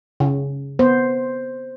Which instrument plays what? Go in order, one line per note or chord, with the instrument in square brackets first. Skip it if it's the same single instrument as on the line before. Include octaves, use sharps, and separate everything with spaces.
[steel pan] C#3
[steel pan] B3 [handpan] C5